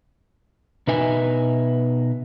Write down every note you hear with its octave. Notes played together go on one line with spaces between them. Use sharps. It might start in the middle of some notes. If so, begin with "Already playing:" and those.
B2 D#4 B4 E5 G#5